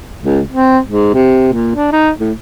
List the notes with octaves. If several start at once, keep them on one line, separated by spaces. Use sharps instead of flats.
C#2
C4
G#2
C3
A#2
D4
D#4
A2